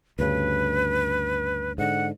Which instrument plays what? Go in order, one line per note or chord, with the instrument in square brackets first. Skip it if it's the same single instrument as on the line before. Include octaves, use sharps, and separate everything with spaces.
[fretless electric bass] D2 G2 C#3 [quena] B4
[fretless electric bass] G#2 D3 [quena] F#5